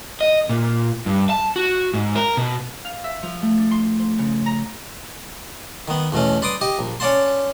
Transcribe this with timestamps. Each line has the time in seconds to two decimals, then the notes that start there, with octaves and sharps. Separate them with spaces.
0.21 D#5
0.49 A#2
1.06 G2
1.30 A5
1.56 F#4
1.94 G#2
2.16 A#4
2.37 B2
2.85 F5
3.04 E5
3.22 F3
3.42 A3
3.57 D4
3.71 C6
3.99 C5
4.18 C#3
4.46 A#5
5.88 D#3 B3
6.12 E2 B2 A3 C#4
6.42 B4 D5 C6 D6 D#6
6.61 G4 D#5
6.79 A#1
7.00 C#4 C#5 D5 F#5 A5 C6